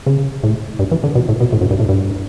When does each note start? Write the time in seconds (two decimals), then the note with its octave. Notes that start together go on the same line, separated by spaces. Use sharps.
0.06 C#3
0.43 A2
0.79 G2
0.92 E3
1.04 D3
1.15 B2
1.29 A2
1.40 B2
1.52 A2
1.61 F#2
1.71 G2
1.80 A2
1.89 G2